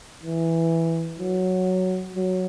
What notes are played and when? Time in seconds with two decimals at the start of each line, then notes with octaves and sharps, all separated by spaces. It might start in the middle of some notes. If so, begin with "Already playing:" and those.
0.23 E3
1.19 F#3
2.15 F#3